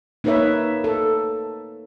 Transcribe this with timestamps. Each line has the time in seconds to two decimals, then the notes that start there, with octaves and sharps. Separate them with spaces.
0.24 A#3 D#4 A#4 B4 C#5 E5
0.84 A4